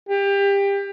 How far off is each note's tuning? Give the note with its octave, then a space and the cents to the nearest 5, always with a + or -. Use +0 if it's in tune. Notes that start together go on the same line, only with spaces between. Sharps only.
G4 +25